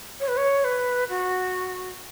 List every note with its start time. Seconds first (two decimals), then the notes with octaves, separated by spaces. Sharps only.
0.20 C#5
0.28 B4
0.37 C#5
0.64 B4
1.09 F#4